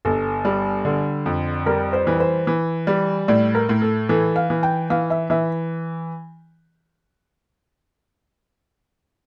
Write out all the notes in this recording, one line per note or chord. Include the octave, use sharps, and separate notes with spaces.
G1 A4
G3
D3
F2
G3 A#4
C5
E3
C5
E3
G3
A2 D5
A#4
A2
A4
E3 A4
F5
E3
G5
E3 F5
E5
E3 E5